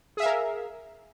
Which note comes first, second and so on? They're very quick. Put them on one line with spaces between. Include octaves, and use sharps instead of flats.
G#4 E5 F5 A#4